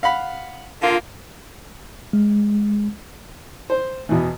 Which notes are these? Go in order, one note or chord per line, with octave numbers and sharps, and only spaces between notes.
F5 F#5 B5
D3 A#3 F4
G#3
C5
E2 B2 E3